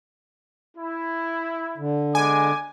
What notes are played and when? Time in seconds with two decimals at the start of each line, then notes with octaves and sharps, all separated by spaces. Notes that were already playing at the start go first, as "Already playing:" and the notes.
0.77 E4
1.78 D3
2.15 G#3 B3 G#5 D6